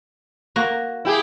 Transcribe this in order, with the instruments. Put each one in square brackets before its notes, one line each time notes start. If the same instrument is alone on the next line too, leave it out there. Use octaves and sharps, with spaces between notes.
[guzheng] A#3 F#4 A#5
[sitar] E4 G4 G#4